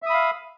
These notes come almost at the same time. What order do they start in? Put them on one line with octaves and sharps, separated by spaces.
E5 D#6 B5 F5